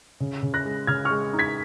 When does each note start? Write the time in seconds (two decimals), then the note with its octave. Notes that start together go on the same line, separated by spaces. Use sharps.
0.20 C#3
0.43 C#3
0.54 F#6 A#6
0.65 G#3
0.87 C#3 F6 G#6
1.05 G#3 C#6 F6
1.33 D#4
1.39 G#6 B6